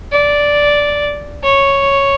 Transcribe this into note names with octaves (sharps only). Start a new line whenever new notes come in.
D5
C#5